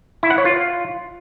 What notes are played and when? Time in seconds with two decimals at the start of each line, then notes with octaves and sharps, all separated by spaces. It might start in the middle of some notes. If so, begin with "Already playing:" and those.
0.23 E4
0.30 F#5
0.38 C#5
0.45 F4